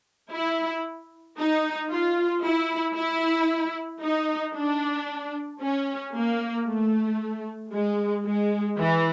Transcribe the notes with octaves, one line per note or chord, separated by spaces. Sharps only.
E4
D#4
F4
E4
E4
D#4
D4
C#4
A#3
A3
G#3
G#3
E3